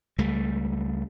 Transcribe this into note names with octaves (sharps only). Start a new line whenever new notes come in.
C#2 G3 A3